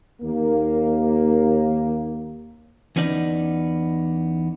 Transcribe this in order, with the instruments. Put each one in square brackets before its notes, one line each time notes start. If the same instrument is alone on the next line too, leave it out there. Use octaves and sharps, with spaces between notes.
[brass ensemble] D#2 A#3
[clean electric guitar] E2 B3 C#4 D#4 D5